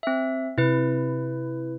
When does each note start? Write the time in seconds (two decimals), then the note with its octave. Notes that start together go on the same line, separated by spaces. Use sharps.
0.03 C4 E5
0.58 C3 E4 B4